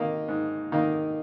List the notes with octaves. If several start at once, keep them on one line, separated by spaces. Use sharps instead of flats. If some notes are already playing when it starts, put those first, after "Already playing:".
Already playing: D#3 A#3 D#4
G#2
D#3 A#3 D#4